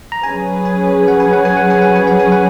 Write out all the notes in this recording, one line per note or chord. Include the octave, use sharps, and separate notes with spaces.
A#5
F#3 C#4 G#4 B4 G#5
G#5
F#5
G#5
F#5
G#5
F#5
G#5
F#5
G#5
F#5
G#5
F#5